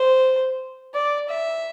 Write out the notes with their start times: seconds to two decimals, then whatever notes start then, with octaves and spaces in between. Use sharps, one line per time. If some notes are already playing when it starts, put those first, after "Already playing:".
Already playing: C5
0.94 D5
1.29 E5